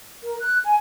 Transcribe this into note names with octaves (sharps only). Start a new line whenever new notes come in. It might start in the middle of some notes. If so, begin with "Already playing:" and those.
A#4
F#6
G#5